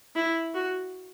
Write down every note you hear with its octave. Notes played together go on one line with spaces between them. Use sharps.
E4
F#4